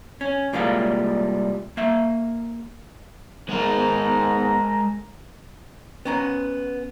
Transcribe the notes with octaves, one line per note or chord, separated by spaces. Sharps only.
C#4
C2 A#2 G3 G#3 A#3 F5
A#3 E5
G#2 G#3 B3 A#4 A#5
B3 C#4 A#5